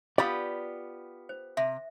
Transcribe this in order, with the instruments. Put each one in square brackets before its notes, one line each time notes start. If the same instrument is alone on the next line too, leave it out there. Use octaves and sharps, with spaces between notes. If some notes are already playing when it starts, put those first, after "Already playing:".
[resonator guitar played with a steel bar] B3 F4 G4 [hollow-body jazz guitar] D5 B5
[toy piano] C5
[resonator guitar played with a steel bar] C3 [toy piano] E5